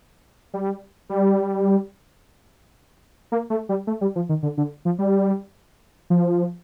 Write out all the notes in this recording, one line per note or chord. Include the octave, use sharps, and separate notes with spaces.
G3
G3
A#3
A3
G3
A3
G3
F3
D#3
D3
D3
F3
G3
F3